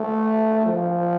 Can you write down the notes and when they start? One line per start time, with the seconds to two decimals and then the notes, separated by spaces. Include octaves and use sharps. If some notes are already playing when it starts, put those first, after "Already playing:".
Already playing: A3
0.65 F3